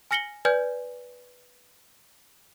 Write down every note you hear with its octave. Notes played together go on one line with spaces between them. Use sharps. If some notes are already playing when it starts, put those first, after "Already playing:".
G#5 F6 A#6 C#7 F#7 G7
B4 D5 G#5 F6 G6 G#6